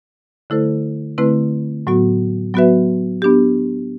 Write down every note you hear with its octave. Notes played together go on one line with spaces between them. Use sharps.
D3 A3 E4 A4 C5
D3 A3 C4 E4 B4
A2 F#3 B3 F#4
F#3 B3 F#4 B4 E5
B3 D4 G4